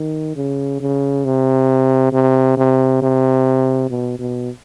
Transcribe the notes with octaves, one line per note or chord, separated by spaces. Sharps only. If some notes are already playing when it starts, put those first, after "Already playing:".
Already playing: D#3
C#3
C#3
C3
C3
C3
C3
B2
B2